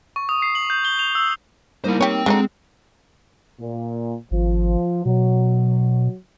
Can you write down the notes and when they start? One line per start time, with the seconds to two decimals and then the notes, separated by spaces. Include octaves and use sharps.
0.16 C#6
0.29 D#6
0.42 C7
0.55 F#7
0.70 G6
0.85 G7
0.99 F7
1.15 E6
1.84 G3 A#3 D#4 E4 C5
2.01 C4 G4 C#5 G5
2.26 D3 F#3 G#3 D#4
3.61 A#2
4.31 G#1 F3
5.06 B2 F#3